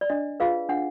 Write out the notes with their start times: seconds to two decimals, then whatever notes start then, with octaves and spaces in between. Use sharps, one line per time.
0.01 D5
0.10 D4 D#5
0.40 F4 G#4 B4 F5
0.69 D4 F#5